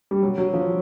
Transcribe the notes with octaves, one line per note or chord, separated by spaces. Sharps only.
G3
B2 F#3
F#3
F3